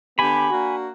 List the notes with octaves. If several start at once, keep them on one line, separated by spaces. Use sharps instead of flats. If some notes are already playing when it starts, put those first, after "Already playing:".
D3 B3 G4 G#5 B5
A#3 D4 F#4